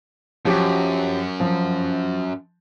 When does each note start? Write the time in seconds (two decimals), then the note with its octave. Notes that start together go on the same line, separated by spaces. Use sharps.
0.45 F#2 F3 F#3 G4
1.40 F3